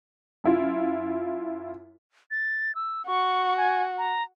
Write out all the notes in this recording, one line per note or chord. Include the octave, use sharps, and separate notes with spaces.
F#2 E4 F4
A6
E6
F#4 C#6
G#5
A#5